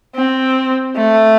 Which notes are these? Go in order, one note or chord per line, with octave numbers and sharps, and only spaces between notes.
C4
A3